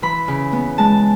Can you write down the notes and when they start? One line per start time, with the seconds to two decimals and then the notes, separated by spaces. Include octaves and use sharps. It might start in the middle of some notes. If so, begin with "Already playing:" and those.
0.02 E3 B5
0.28 C#3
0.53 B3
0.78 G#3 A5